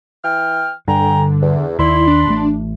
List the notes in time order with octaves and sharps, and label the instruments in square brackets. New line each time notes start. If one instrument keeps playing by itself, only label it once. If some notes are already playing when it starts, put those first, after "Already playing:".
[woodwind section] E3 G5 F6
[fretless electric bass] G2 [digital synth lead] D3 [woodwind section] G5 G#5 A#5
[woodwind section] E2
[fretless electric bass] D#2 D#3 [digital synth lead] E4 [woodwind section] D5 B5 C6
[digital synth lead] D4
[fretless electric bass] A1 A2 A3